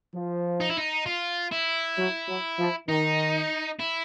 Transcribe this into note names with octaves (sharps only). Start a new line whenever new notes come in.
F3
D#4
E4
D#4
F4
E4
F#3
F#3
F3
D#3 D#4
E4